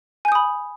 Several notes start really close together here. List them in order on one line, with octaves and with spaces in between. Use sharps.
G#5 G6 D#6 B5